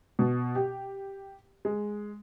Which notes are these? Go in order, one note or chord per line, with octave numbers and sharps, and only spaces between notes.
B2
G4
G#3